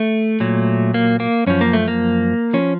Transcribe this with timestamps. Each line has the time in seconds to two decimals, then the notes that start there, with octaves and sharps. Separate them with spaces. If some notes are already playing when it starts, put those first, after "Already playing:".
Already playing: A3
0.40 A#2 F#3
0.94 A#3
1.20 A#3
1.47 F#2 F3 C#4
1.61 A#3
1.73 A3
1.88 A#3
2.53 F3 C#4